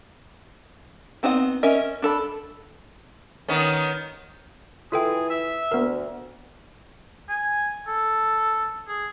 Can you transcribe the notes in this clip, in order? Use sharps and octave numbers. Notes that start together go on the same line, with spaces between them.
B3 C4 D#4 C5 F#5
C#4 A#4 D#5 E5
D4 A4 B5
D#3 B3 C#4
E3 F4 G#4 A4 G5
E5
D2 B3 A#4
G#5
A4
G#4